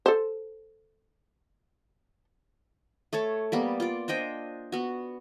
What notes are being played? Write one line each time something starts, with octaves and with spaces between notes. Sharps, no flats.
A4 C5
A3 A4 C#5 A5
G3 A#3 B3
F4 D5
D4 C5 D#5 G5
B3 F#4